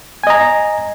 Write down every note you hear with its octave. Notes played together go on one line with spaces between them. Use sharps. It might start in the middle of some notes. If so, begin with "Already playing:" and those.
D#5 G#5 A#5